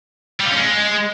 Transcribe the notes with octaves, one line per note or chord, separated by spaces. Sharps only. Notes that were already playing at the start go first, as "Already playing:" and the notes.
G3
F4
C#4
G#3